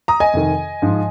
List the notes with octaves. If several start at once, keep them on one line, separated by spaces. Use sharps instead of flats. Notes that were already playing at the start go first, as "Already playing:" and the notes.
A#5 D#6
D#5 G#5
F2 C3 D#3
G#2 F3